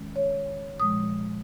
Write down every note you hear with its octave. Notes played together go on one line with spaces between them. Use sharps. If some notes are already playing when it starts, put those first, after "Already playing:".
Already playing: D#3 G#3 C#4
C#5
A#2 F3 G#3 D#6